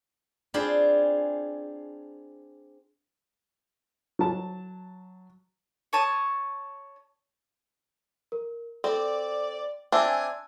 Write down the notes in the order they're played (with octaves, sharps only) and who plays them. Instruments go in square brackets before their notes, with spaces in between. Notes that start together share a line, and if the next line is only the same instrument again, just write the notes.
[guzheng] C4 D4 F4 G#4 C5 B5
[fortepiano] F#3 A5
[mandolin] C#5 A5 D#6
[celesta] A#4
[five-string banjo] C4 [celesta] A4 [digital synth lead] D5
[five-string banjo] C4 D4 [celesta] E5 A5 E6 [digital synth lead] G#5